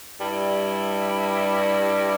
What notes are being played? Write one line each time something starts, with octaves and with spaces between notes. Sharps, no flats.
G2 G3 E4